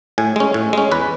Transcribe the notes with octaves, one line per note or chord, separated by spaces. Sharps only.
A2 G#5
G#3 C#4
A2
G#3 C#4
E2 B4